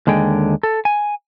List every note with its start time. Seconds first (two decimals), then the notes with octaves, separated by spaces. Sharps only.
0.07 D#2 D3 G#3 G#4 G5
0.63 A4
0.85 G#5